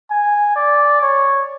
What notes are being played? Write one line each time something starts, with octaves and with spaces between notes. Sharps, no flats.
G#5
D5
C#5